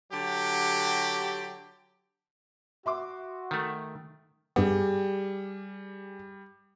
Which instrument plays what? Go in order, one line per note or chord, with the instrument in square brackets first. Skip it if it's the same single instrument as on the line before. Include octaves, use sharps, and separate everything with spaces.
[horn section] D3 F#3 G4
[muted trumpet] F#4 [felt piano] E5 C6 D6
[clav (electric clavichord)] D#3 A3
[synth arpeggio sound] G2 B3 [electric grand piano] G3 [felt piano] G4 G#4